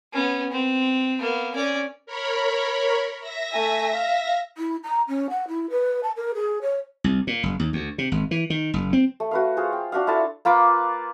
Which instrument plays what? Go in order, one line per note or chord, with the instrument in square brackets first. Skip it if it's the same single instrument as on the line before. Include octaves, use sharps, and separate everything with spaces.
[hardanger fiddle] B3 C#4
C4
A#3 B3
C#4 D5
[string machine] A#4 C#5 B5
E5 A#6
[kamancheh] A3 G#5
F5
[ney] E4
A#5
C#4
F#5
E4
B4
A5
A#4
G#4
C#5
[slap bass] C2
A#2
F#1
D#2
D2
C3
G#1
E3
D#3
F#1
C4
[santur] A3
F#4 B4 F5
F4 G#4 C5
G5
D4 F#4 E5 F5
E4 F4 A4 A5
A#3 F4 B4 D6